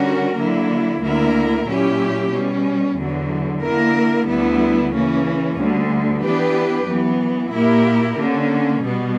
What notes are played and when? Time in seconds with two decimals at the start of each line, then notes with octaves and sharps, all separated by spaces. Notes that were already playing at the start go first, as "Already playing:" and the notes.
Already playing: D3 G3 C#4 F#4 A#4
0.37 D3 F#3 A#3 E4
1.01 D2 D3 A#3 E4 A#4
1.66 A#2 F#3 C#4 E4 G4
2.31 B2 G3 C#4
2.96 E2 D3 F#3
3.62 D3 A#3 E4 A#4
4.27 D2 D3 G3 B3 E4
4.92 C#3 E3 A#3 C#4
5.57 D2 D3 G3
6.22 E3 B3 D4 G4 B4
6.88 F#2 E3 B3
7.52 A#2 A#3 E4 G4 A#4
8.17 D3 A#3 C#4
8.82 B2 G3 B3